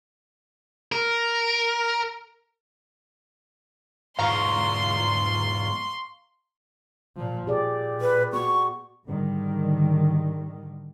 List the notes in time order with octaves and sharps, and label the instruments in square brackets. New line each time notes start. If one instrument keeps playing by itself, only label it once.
[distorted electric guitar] A#4
[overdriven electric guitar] E2 G#2 [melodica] F4 [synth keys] F5 A#5 C#6 [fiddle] C6
[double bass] A#2 F3
[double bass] A#2 [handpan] G4 G#4 D5
[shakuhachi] B4
[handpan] B3 F#4 [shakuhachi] C#6
[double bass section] G#2 D3 D#3 G3